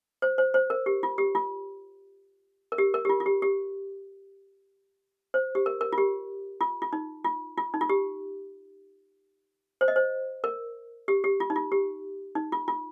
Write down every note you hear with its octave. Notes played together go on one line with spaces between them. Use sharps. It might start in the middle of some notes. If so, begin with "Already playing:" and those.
C5
C5
C5
A#4
G4
F4
G4
F4
A#4
G4
A#4
G4
F4
F4
G4
G4
C5
G4
A#4
A#4
F4
G4
F4
F4
D#4
F4
F4
D#4
F4
G4
C5
D#5
C5
A#4
G4
G4
F4
D#4
F4
G4
D#4
F4
F4